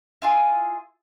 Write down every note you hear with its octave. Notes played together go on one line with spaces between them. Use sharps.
E4 F4 G#4